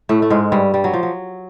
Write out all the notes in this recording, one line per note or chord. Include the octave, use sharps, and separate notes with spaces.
A2 A3
A3
G#2 G#3
G2 G3
G3
F#3
F3
F#3